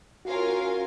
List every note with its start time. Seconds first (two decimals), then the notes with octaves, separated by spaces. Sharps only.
0.25 C#4 F4 F#4 A#4 F5 G#5
0.50 F#4